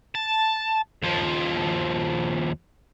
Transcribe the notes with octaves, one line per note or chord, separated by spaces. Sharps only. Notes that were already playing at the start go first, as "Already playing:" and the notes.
A5
D#2 F3